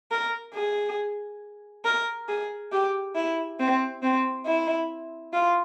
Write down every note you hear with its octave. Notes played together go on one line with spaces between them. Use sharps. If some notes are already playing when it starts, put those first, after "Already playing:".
A#4
G#4
A#4
G#4
G4
E4
C4
C4
E4
F4